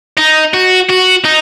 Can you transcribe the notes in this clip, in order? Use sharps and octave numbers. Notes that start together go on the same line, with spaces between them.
D#4
F#4
F#4
D#4